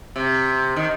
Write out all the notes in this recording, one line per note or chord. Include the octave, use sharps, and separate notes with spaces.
C3
D#3